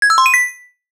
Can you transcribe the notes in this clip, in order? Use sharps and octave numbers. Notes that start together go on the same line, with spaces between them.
G#6
E6
C6
D#7
B6